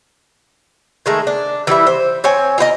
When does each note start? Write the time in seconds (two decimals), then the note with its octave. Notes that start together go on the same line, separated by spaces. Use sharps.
1.06 D#3 G#3 A3
1.27 D4
1.67 E3 G3 E4 E5
1.87 C5
2.24 C4 C#5 G#5
2.58 F4 A#4 C5 D#5